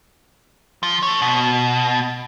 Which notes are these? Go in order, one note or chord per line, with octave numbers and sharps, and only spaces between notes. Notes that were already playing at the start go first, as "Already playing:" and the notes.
F3
A4 C#5
B2